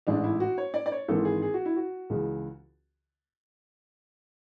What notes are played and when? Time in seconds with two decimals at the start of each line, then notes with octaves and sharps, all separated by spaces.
0.07 A1 G#2 E3 D4
0.24 E4
0.40 F#4
0.58 C#5
0.74 D5
0.86 D5
0.92 C#5
1.08 G#1 G#2 E3 A4
1.25 G#4
1.42 G#4
1.54 F#4
1.65 E4
1.76 F#4
2.10 C#2 C#3 E3